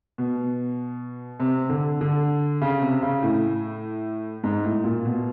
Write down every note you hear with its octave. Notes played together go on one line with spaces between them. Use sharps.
B2
C3
D3
D3
C#3
C3
C#3
A2
G#2
A2
A#2
B2